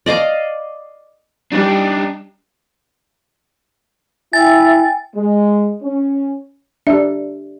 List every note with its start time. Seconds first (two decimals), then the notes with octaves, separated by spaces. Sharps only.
0.06 D5 D#5 F5 D6
1.52 G3 D4 D#4
4.33 E4 E5 G5 G#5 A6
5.14 G#3
5.82 C#4
6.87 D4 G4 E5